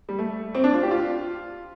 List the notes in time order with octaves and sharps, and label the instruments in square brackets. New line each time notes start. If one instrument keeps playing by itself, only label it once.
[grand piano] G3
A3
C4
D4
F4
G4
F4